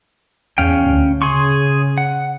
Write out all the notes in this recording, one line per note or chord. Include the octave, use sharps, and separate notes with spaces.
E2 C#4 F5 G5
D2
C#3 G#4 C6 C#6
F#5